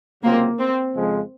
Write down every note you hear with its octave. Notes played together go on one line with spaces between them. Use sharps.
C#2 C3 F#3 A#3 C4 F4
C4
F2 C#3 F3 G#3